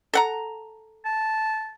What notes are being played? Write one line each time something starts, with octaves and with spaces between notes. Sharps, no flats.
A4 F#5 A#5
A5